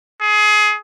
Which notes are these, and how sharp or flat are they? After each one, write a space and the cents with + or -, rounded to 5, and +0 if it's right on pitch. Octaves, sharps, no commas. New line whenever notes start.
G#4 +25